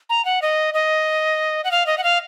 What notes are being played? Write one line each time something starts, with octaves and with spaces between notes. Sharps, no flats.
A#5
F#5
D#5
D#5
F#5
F5
D#5
F#5
F5